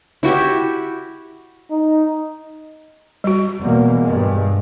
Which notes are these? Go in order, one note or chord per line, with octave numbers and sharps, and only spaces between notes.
E4 F#4 G4 E5
D#4
G3 F#4
E2 B2 A#3
G2 G#3